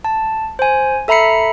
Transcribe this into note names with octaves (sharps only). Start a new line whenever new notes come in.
A5
C5 G#5
A4 E5 A#5 B5 C7 C#7